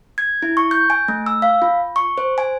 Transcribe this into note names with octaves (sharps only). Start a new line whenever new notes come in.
G#6
E4
C#6
G6
G#5
A3
E6
F5
F4
C#6
C5
G#5